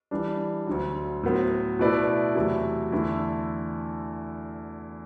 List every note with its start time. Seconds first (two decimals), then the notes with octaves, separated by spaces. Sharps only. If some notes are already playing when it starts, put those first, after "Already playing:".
0.11 E3 G3 D4
0.67 D2 D3 F#3
1.23 A2 F#3 B3 F#4 C5
1.79 B2 A3 E4 B4 D5
2.36 E2 C3 F#3 A3 E4
2.92 E2 D3 A3 E4